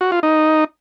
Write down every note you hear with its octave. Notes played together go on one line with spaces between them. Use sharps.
F#4
F4
D#4